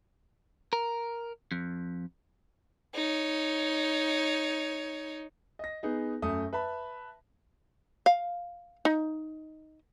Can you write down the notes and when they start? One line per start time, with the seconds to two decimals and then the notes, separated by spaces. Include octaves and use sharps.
0.73 A#4
1.52 F2
2.95 D#4 C#5
5.59 D#5 A#6
5.83 B3 D#4 G#4
6.22 F#2 A3 D#6
6.53 B4 E5 A5 B5
8.06 F5
8.85 D#4